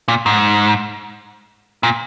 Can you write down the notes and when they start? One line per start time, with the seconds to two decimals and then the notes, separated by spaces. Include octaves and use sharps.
0.08 A#2
0.26 G#2
1.83 A#2